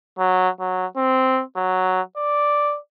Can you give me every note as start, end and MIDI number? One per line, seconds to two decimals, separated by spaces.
0.19 0.49 54
0.60 0.86 54
0.97 1.43 60
1.57 2.01 54
2.17 2.78 74